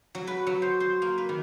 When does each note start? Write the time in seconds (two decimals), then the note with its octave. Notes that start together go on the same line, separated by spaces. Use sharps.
0.15 F#3
0.27 B4
0.47 F#3
0.62 C5
0.80 C5
1.02 A#3
1.18 B4
1.29 D#3